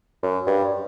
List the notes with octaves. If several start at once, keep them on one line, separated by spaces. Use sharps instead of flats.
F#2
G2